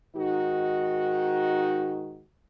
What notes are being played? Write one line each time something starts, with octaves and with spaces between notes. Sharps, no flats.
G#2 D#3 D#4 F#4